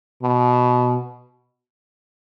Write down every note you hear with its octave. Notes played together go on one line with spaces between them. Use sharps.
B2